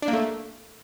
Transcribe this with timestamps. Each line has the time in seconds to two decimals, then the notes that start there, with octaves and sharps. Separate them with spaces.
0.02 D4
0.08 A#3
0.13 A3